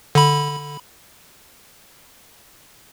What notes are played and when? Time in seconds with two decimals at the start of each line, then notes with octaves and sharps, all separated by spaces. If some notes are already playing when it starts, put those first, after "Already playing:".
0.15 D3 B5